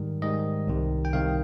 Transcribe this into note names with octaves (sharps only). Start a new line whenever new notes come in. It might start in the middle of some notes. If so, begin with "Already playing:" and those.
Already playing: G#2 D#3 G3
G#2 D#3 G3 D#5
C2 C3 D#3
G5
C2 C3 D#3 F5